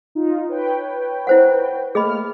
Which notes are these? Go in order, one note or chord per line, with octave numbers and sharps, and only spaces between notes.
D#4 F4
B4 C#5 G5
E4 C5 F#5
A3 A#3 G#4 D#5 B5 F6